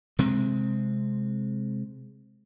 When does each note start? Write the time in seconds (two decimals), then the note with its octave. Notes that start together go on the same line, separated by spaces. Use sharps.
0.19 C3 G#3 C4